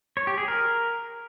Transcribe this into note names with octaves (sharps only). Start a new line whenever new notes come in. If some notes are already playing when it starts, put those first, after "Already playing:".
C#5
G4
G#4
A#4